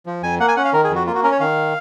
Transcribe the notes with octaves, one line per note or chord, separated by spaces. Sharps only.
F3
F2 G#5
A#3 F#5
G#5
C#4 F#5
F5
D#3 A#4
G#4
F2
F#4
A#3 F4
F#4
C#4 A#4
C#5
D#3 F5